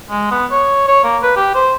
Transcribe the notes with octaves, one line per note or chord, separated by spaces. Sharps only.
G#3
B3
C#5
C#5
A#3
B4
G4
C5